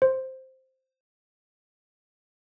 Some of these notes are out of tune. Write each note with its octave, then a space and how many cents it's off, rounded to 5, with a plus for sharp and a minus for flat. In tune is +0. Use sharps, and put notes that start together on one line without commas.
C5 +0